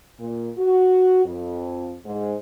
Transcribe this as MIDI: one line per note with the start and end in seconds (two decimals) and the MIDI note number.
0.19 0.50 46
0.58 1.22 66
1.25 1.95 41
2.06 2.34 44